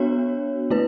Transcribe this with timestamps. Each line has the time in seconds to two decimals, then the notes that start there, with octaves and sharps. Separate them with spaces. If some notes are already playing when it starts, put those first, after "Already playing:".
Already playing: B3 D4 F#4 C#5
0.70 A3 E4 B4